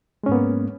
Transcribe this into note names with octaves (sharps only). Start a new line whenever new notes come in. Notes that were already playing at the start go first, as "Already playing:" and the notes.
G#2 G#3 A#3 B3 C#4